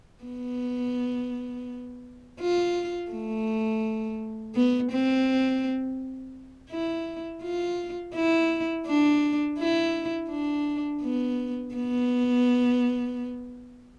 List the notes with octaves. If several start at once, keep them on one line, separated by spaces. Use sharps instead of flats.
B3
F4
A3
B3
C4
E4
F4
E4
D4
E4
D4
B3
B3